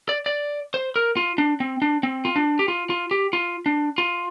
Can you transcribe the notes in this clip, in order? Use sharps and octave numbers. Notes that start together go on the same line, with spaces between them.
D5
D5
C5
A#4
F4
D4
C4
D4
C4
F4
D4
G4
F4
F4
G4
F4
D4
F4